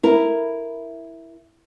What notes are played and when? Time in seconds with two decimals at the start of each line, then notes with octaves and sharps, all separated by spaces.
0.03 E4 A#4